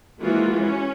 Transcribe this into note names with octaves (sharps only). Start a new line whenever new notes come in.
E3 F3 G#3 A#3 F4 F#4
C#4